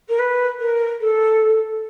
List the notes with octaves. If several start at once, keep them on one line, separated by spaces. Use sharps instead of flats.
A#4
B4
A#4
A4